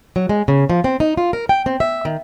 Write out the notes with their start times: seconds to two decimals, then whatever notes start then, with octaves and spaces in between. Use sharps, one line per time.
0.16 F#3
0.29 G#3
0.48 C#3
0.70 F3
0.84 C4
1.00 D#4
1.17 F4
1.33 A#4
1.49 G5
1.66 C4
1.80 E5
2.05 D#3